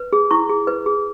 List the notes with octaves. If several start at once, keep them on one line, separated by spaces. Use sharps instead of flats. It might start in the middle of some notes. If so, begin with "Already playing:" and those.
Already playing: B4
G#4
E4 C#6
G#4
B4
G#4